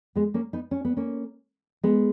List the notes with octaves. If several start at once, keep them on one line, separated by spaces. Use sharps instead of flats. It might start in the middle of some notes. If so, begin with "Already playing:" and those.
G#3 B3
A#3 C#4
B3 D#4
C#4
B3
A#3 C#4
G#3 B3